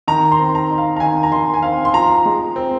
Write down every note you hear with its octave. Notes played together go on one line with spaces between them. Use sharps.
D#3 A#5
C6
C4
A#5
D#4
F5
A#5
D#3 G#5
A#5
D#3 C6
G#5
C4 F5
C6
F3 A#5
G#3
C4